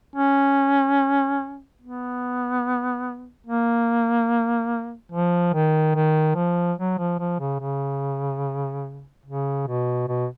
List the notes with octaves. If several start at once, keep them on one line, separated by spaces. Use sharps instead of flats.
C#4
B3
A#3
F3
D#3
D#3
F3
F#3
F3
F3
C#3
C#3
C#3
B2
B2